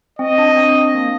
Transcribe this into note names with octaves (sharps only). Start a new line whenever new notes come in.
C4 D#5
D4
D4
C4
A#3